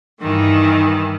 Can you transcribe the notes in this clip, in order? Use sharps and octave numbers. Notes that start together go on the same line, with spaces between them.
G2 D#3 E3